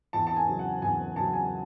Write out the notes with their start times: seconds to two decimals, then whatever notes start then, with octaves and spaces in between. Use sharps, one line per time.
0.13 E2 A5
0.27 A5
0.36 G#5
0.48 C#3 F#3
0.59 F#5
0.82 E2 G#5
1.16 C#3 F#3 A5
1.33 G#5